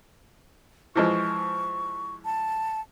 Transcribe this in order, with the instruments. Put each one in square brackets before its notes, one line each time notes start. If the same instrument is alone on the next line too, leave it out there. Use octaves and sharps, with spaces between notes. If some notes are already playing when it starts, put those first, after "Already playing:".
[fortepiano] E3 F3 G#3 [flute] C#6
[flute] A5